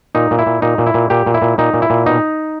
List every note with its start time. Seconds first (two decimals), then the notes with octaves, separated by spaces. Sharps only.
0.15 A#2 D#4
0.31 A#2
0.39 E4
0.46 A#2
0.62 A#2 D#4
0.78 A#2
0.86 E4
0.94 A#2
1.10 A#2 G4
1.26 A#2
1.34 E4
1.42 A#2
1.58 A#2 D#4
1.74 A#2
1.82 E4
1.90 A#2
2.06 B2 D#4